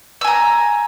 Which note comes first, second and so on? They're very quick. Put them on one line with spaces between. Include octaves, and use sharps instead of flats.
E6 G#5 A#5